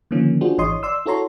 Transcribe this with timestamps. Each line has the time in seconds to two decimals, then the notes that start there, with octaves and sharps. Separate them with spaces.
0.11 D3 D#3 F3 A#3 C#4
0.41 D4 F4 F#4 G#4 C5
0.58 G#1 E3 C#5 D#5 C6 D#6
0.83 D5 C6 E6
1.06 E4 F#4 A4 C#5 A#5 C6